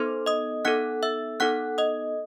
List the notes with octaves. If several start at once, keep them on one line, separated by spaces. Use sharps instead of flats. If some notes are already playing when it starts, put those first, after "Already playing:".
Already playing: B3 D#4 A4 C5 C6
D#5 D#6
B3 D#4 A4 F#5 F#6
E5 E6
B3 D#4 A4 F#5 F#6
D#5 D#6